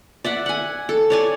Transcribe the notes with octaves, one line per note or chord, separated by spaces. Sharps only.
D5 E5 F#5
F#5 G#5
A4
C#5 D5 G#5